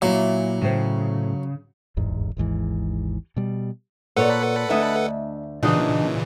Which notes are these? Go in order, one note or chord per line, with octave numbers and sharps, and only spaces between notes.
A#2 F#3 E4 F5
A2 C#3 C5
D1 G1 E2 G#2
G#1 D#2 G#2 E3
B2 G3
A#2 A4 B4 C#5 D5 F#5
D2 D4 D#5 E5 G#5
A#2 C#3 E3 D4 D#4 F#4 D#5